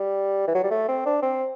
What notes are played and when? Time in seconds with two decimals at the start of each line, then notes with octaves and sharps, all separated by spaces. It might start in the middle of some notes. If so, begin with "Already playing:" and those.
Already playing: G3
0.48 E3
0.55 F#3
0.64 G3
0.70 A3
0.88 C4
1.06 D4
1.22 C4